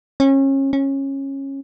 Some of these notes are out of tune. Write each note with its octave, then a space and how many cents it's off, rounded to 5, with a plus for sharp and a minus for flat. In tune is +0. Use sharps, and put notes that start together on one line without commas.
C#4 -30
C#4 -20